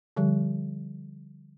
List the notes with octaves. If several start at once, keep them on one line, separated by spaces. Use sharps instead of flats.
D3 F3 G3 G4